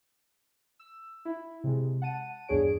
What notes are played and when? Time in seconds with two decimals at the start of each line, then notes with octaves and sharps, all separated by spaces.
0.79 E6
1.25 E4
1.64 C3 G#3
2.02 F#5 A5 D#7
2.48 E2 G2 D4 G#4 C#5 D7